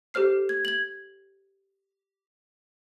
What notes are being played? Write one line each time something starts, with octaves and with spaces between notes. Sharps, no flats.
G4 A4 C5 F6 C7
G#6
G#6 F#7